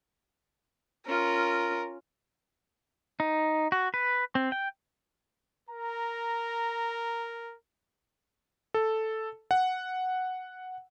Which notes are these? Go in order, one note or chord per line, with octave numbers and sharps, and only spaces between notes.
C#4 F4 A#4
D#4
F#4
B4
C4
G5
A#4 A#5
A4
F#5